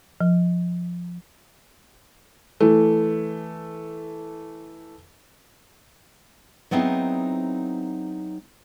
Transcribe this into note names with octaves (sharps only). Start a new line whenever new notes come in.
F3
E3 A3
F#3 B3 C4 D#4 E4 G#4